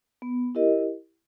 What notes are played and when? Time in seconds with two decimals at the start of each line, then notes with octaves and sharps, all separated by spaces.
0.22 B3
0.55 E4 G4 A#4 D#5